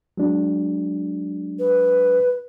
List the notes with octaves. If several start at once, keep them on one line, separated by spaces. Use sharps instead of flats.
F#3 G#3 D4
B4